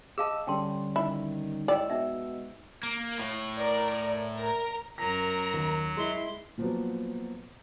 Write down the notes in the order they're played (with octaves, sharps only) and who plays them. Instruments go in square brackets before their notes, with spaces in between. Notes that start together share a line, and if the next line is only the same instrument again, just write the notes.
[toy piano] G#4 F5 A5 [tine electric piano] D#5 E6
[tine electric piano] D3 G3 C#4 [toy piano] G5 A5 C6
[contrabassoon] D#3 [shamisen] E4
[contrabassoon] A2 [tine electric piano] G#3 E6 [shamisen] D5 [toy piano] D#5 G5
[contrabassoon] B2 [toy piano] D#4 E5
[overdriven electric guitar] A#3
A2
[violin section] A#4 D5
A#4 A#5
[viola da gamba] F#2 A#4 [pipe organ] F#3 [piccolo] A#5 [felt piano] A#6
[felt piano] D#2
[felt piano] G#3 [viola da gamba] E4 [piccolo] C6
[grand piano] A#2 F3 F#3 B3